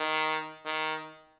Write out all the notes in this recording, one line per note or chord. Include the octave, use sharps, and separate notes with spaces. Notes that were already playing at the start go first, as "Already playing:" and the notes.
Already playing: D#3
D#3